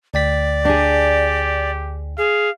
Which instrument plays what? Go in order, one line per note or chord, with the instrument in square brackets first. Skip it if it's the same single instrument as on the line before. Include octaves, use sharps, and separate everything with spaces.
[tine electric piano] D2 G5 B6 [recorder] D5
[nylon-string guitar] D4 G#4 [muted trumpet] G4
[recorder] G#4 [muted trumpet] F5